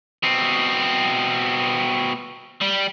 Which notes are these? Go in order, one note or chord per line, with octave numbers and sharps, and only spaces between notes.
B2 C4
G3